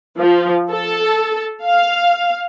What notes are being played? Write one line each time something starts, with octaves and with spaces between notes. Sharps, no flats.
F3
A4
F5